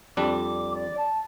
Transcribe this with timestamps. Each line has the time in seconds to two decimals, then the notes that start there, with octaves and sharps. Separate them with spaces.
0.17 F2 G3 D4 D6
0.75 D5
0.98 A5